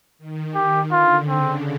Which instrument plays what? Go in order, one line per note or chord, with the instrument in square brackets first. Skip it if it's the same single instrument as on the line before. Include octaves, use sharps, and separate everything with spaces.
[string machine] D#3
[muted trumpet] G4
[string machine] D3 [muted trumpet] F4
[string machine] C#3 [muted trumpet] C4